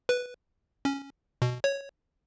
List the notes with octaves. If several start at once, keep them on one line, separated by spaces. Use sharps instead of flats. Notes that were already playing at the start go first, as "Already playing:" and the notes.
B4
C#4
B2
C#5